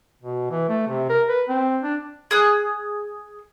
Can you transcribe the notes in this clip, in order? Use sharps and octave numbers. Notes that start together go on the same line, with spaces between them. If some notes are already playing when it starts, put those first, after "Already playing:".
B2
E3
A3
C3
A#4
B4
C4
D4
G#4 D#6 F#6